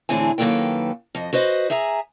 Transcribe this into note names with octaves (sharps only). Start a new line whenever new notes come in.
A2 D3 E3 C4 G#4 G#5
F#2 D#3 A#3 A4 B4 G5
F2 D#5
F#4 B4 C5 D#5
G#4 E5 G#5 A#5